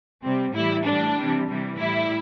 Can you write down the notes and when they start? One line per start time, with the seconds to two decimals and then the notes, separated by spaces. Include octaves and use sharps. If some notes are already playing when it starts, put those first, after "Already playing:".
0.23 C3 G3 C4
0.53 A2 E3 G3 E4
0.85 A2 E3 G3 D4
1.16 C3 E3 G3
1.48 C3 E3 G3
1.79 A2 G3 E4